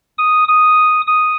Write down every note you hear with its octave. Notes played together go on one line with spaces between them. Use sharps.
D#6
D#6
D#6